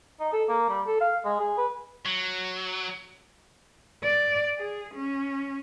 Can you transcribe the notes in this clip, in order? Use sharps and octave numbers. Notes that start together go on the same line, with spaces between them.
D#4
A4
A#3
G3
A4
F5
G#3
G#4
B4
F#3
D5
G#4
C#4